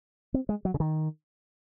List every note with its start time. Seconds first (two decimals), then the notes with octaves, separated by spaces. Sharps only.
0.34 C4
0.49 G#3
0.65 F#3
0.74 C#3
0.80 D#3